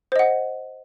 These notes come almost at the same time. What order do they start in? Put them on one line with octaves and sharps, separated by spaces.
C5 D#5 F#5